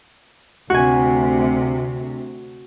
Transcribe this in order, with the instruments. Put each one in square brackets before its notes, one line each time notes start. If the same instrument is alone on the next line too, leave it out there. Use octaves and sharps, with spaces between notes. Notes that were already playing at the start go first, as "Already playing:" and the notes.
[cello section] D2 C3 [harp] F#4 G#5